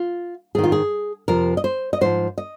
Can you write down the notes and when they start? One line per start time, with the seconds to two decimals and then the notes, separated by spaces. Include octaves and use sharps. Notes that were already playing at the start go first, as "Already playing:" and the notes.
Already playing: F4
0.55 G#2 D#3 G#4
0.64 F4
0.72 G#4
1.28 F2 C3 F3 A#4
1.57 D#5
1.64 C5
1.93 D#5
2.01 G#2 F3 C5
2.38 D#5